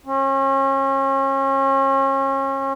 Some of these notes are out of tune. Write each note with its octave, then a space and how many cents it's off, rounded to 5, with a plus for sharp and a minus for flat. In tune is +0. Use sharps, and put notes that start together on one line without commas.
C#4 -35